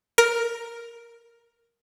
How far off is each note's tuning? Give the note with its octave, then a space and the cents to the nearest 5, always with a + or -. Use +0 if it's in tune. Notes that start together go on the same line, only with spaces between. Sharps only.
A#4 +5